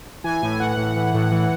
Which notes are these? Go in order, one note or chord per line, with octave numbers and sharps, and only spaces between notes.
E3 G#5
A2
E3 F#5
A2
E3
A2
E3